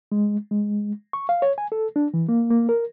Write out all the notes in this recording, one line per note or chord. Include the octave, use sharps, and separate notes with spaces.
G#3
G#3
C#6
F5
C#5
G#5
A4
D4
E3
A#3
A#3
A#4